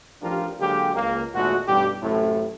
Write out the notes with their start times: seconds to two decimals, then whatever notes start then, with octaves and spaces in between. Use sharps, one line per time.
0.21 A1 F3 D4 F4 G4 A#4
0.59 D3 F#3 G#3 A#3 G4
0.94 C#2 A#3
1.34 G#1 A#2 G#3 A3 F#4
1.67 A1 G2 B2 G3 G4
2.01 A1 F#2 A2 C3 A3